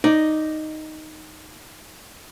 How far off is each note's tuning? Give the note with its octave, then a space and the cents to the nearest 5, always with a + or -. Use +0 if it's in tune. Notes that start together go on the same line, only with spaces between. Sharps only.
D#4 +0 D5 +0